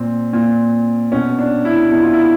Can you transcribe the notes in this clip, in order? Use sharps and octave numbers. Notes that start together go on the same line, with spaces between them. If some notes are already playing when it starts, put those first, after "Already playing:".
Already playing: A#2 C4
A#2
B2 C#4
D4
E4
B2 E4
F4
E4